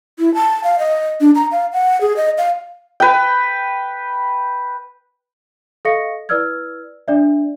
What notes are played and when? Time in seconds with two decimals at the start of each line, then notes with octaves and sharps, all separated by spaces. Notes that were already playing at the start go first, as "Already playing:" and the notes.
0.19 E4
0.35 A5
0.64 F5
0.79 D#5
1.21 D4
1.35 A#5
1.52 F5
1.73 F#5
2.01 G#4
2.17 D#5
2.38 F5
3.00 B4 G5
5.85 A4 D#5 F5 C#6 A#6 C#7
6.29 E4 B4 D5 E6 F6 G#6
7.08 D4 D5 E5